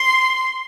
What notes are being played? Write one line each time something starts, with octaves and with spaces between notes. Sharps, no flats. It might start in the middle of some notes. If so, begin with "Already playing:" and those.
Already playing: C6